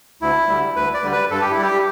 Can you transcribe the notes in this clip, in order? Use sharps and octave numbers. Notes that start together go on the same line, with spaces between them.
D2 E4
D3 G3
D2 B4
D5
D3 G3
B4
G2 A4
G4
E4
G3 G4